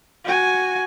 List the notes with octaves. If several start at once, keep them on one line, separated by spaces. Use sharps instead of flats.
F#4 G#5